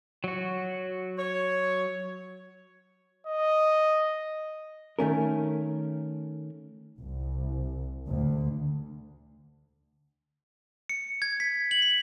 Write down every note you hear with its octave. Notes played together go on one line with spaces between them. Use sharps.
F#3 F#4
C#5
D#5
D#3 A3 C#4 A#4
C2
D2
C#7
G#6
B6
F#7
B6